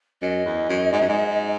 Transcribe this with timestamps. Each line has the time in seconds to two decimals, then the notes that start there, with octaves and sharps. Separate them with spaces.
0.22 F#2 D#5
0.46 E2
0.69 F#2
0.92 G#2
1.01 F#2
1.09 G#2